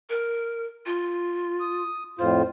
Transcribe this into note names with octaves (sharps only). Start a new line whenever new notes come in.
A#4
F4
D#6
F2 A2 F4 C5